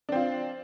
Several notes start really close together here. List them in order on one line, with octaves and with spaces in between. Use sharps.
D4 C4 F4